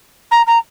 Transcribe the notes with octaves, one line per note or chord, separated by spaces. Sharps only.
A#5
A#5